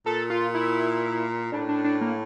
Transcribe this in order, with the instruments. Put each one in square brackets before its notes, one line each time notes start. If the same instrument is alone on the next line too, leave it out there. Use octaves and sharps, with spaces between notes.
[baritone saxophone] A#2 [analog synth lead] A4
[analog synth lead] F4
E4
[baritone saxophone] A2 [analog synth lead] D4
[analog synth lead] D4
D4
A#3